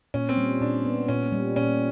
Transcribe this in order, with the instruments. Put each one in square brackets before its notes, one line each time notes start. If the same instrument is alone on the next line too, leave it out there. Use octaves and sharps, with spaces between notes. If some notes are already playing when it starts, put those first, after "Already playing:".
[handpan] A#2 [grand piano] C#4
[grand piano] C4
[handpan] G3
[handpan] A#2 [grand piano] D4
[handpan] B3
[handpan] A#2 [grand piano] C#4
[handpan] G3
[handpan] A#2 [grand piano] C#4